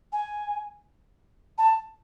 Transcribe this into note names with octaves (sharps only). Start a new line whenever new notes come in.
G#5
A5